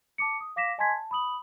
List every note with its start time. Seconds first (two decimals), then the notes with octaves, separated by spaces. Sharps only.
0.18 A5 D6 C#7
0.40 D#6
0.56 F5 D6 A#6 B6 E7
0.78 D#5 G#5 A5 C6 G#6 B6
0.91 A5
1.11 B5 D#6 F#7